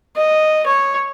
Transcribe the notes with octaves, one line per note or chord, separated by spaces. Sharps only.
D#5
C#5